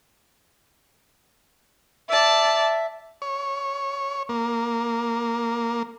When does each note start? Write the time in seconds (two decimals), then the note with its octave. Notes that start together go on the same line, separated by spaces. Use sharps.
2.08 D5 E5 A5
3.22 C#5
4.29 A#3